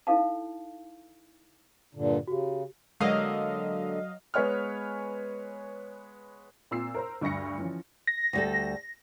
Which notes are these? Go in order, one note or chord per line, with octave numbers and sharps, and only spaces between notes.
D#4 E4 A4 F5 A5
G2 A#2 D3
C#3 F#4 G4
D3 F#3 G#3 A#3 D#5 F5
G#3 B3 B4 C#5 G#5 F6
A#2 C4 E6 C7
A#4 C5 A#5
D2 G2 C#6 A#6 C#7
E3 F3 C#4
A#6
D2 G3 A4